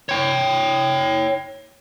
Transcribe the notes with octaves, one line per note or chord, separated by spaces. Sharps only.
C#5 G5